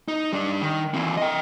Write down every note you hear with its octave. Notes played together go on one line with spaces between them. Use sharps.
D#4
G3 D4
D#3
E3 C4
D#5 G5